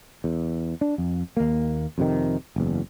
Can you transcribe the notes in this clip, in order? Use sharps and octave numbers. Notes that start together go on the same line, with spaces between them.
E2
D4
F2
D#2 A#3
F2 C3 D#3
F#1 E2